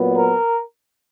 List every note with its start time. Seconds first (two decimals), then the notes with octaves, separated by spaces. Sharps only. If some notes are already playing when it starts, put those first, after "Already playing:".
Already playing: A#2 F#3 B3
0.16 A#4